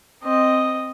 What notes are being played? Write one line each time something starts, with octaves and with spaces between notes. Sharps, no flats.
C4 D#5